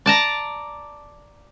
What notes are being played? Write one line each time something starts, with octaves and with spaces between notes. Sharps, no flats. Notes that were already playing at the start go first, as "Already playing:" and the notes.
D5 A5 A#5